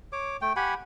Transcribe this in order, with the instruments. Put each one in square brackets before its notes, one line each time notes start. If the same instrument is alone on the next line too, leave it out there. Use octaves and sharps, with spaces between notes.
[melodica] C#5 D6
A3 G5
G4 F#5 G#5 B5